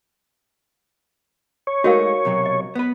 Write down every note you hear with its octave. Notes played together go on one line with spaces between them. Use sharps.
C#5
G#3 A3 D#4 F#4 A#4 F5
B1 C3 F#3
D#5
B3 B4